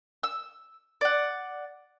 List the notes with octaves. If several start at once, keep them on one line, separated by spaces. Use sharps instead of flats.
E6
D5 F#5